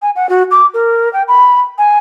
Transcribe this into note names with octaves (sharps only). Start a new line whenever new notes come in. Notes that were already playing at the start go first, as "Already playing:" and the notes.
G#5
F#5
F#4
D6
A#4
G5
B5
G#5